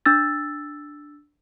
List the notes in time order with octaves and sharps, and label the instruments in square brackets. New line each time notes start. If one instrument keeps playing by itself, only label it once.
[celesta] D4 E6 A6